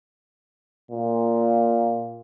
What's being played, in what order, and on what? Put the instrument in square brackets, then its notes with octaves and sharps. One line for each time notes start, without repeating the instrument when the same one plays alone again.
[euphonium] A#2